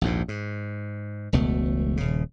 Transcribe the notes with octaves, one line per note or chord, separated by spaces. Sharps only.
A#1 D#2 G#2
G#2
E1 C#2 B2 A3
D#1 C#3